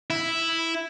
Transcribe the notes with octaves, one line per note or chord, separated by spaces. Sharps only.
E4